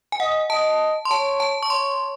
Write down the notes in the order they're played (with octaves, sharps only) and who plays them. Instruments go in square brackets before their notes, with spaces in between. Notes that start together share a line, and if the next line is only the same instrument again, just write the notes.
[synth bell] G#5
[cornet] D#5 [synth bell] F#5
[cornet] D#5 [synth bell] A5
[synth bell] C6
[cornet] C#5 [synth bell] A5
[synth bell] A5
C#6
[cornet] C#5 [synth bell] C6